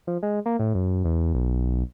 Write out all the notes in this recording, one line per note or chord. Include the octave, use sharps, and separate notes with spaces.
F3
G#3
A#3
A2
F#2
E2
B1